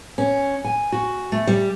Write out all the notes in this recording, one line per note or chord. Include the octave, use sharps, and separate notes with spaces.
C#4
G#5
F#4
A3
G3